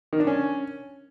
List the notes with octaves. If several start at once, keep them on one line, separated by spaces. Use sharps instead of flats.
D#3
D4
C#4